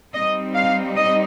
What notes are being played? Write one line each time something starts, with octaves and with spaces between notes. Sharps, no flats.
G3 C4 D#4 D#5
F5
D#5